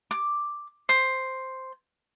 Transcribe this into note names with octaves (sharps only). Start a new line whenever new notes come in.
D6
C5